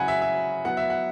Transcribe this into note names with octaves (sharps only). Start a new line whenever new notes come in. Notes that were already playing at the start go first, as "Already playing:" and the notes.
Already playing: C#3 F#3 E4 F#5 G#5 B5
E5
E5
F#3 B3 E4 F#5
E5
F#5